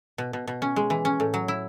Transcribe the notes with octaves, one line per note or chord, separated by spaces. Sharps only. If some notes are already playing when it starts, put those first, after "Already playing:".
B2
B2
B2
C#4
G#3
E3
C#4
A2
F#3
E4